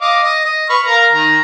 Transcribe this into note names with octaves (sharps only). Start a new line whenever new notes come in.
D#5 F5 D6
D#5
D#5
B4 C#6 F6
A#4 F5 A#5
D#3 A#5